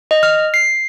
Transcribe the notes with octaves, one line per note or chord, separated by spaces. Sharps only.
D#5
F6
C7